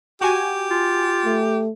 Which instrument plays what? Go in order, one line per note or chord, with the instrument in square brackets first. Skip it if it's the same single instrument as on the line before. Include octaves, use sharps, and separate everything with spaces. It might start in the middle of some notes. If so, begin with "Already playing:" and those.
[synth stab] F#4 G#5 [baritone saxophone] G4
[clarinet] F4
[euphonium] A3